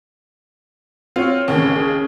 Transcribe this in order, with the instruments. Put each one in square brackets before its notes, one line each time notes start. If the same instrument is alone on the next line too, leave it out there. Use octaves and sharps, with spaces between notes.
[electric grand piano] C4 C#5 [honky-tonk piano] F4
[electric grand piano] A1 [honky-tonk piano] D#2 C#3
[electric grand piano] C#4 G#4